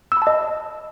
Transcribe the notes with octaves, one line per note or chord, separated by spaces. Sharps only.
E6
B5
A5
D#5